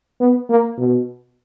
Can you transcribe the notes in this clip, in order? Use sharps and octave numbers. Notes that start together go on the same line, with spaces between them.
B3
A#3
B2